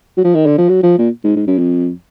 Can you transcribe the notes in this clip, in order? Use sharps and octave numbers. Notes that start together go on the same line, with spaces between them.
F#3
F3
D#3
D3
F3
F#3
F3
A#2
G#2
G#2
F#2
F2